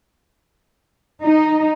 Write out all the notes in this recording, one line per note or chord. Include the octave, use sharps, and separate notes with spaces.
D#4